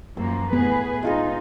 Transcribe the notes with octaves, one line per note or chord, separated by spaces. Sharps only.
F#2 F3 A#3 E6
A2 B3 G#4 B4
G#3 D#4 F4 G#4